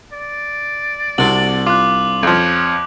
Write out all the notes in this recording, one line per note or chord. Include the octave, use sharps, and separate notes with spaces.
D5
C2 C3 D4 F#4 F#7
F4 D6 F#6
F2 F3 C#5